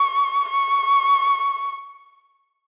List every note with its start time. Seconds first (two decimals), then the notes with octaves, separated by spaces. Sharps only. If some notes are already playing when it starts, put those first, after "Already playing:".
Already playing: C#6
0.50 C#6